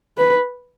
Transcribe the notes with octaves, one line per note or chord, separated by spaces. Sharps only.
B4